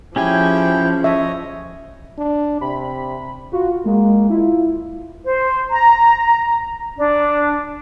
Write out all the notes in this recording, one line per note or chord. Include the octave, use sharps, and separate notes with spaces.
F3 C#4 E4 G4 G#4 G5 G#5
C#5 D#5 E5
D4
C3 B5
F4 F#4
G#3 A#3
E4 F4
C5
A#5
D4